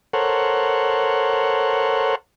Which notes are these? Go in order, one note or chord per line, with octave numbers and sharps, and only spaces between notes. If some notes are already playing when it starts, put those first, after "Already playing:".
A4 A#4 C5 C#5 F#5